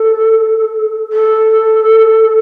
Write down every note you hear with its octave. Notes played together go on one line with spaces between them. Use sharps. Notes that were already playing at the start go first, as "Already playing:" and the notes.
Already playing: A4
A4